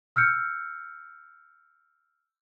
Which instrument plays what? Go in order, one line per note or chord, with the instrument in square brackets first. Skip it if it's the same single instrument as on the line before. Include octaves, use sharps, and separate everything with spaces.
[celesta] E6 F6 G6 C#7